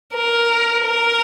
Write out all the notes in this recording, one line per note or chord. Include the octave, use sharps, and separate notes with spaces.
A#4
A#4